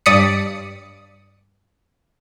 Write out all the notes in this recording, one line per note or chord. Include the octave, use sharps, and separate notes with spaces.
G2 D5 D#6 B6 C#7